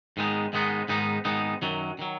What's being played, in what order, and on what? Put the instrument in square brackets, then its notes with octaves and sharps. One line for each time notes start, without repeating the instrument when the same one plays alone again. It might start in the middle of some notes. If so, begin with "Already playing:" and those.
[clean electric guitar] G#2 D#3 G#3 B3 D#4
G#2 D#3 G#3 B3 D#4
G#2 D#3 G#3 B3 D#4
G#2 D#3 G#3 B3 D#4
F#2 D#3 F#3
D#3 F#3